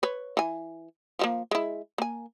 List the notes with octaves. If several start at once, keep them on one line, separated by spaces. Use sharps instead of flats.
B4 C#5
E3 G#5
F3 G3 A#3
G#3 E4
A#3 G#5